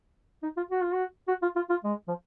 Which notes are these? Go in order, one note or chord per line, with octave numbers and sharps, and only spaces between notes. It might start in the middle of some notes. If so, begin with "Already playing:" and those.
D#4
F4
F#4
F4
F#4
F#4
F4
F4
F4
G#3
F3